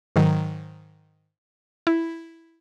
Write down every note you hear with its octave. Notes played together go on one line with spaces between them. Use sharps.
G#2 D#3 F#3
E4